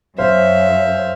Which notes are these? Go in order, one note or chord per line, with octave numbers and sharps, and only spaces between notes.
F#2 C5 E5 F5